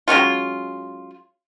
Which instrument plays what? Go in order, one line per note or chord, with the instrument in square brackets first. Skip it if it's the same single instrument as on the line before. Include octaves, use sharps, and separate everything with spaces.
[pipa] F#3 G#3 C#4 F4